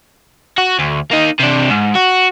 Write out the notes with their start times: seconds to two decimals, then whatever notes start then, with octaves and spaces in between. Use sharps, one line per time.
0.58 F#4
0.79 D2
1.11 A#3 D#4
1.39 C3 D4
1.70 G#2
1.95 F#4